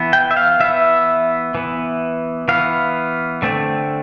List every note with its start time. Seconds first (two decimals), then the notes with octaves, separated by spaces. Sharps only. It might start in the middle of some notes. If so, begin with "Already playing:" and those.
Already playing: E3 B3
0.13 G5
0.31 E5
0.37 F5
0.60 E3 B3 E5
1.55 E3 B3
2.48 E3 B3 F5
3.42 D3 A3 C4